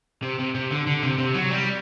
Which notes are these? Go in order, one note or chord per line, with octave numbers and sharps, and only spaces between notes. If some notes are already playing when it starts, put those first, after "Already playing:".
C3
C3
C3
D3
D3
C3
C3
F#3
G3